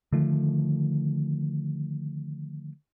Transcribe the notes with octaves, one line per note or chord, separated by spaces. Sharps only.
D3 D#3 F3 A3